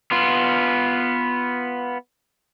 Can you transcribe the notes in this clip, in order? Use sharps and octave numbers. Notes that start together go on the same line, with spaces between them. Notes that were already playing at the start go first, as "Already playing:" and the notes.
B3 F4